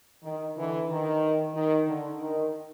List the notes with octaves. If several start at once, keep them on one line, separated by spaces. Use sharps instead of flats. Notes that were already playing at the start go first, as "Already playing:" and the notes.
D#3
D3 E3
D#3
D#3
D3
D#3